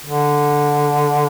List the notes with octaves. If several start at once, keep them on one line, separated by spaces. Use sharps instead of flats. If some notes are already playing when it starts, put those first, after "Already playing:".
D3